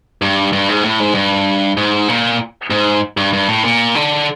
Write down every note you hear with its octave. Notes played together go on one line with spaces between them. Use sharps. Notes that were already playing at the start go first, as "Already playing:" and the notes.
G2
G2
G#2
A2
G#2
G2
G#2
A#2
G#2
G2
G2
A2
A#2
D3